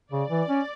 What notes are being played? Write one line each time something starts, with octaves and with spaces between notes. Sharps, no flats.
C#3 D5
E3
C#4